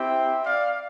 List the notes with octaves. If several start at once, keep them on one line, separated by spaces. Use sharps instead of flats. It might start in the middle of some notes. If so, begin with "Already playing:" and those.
Already playing: C4 E4 G4 E5 G5
D5 F5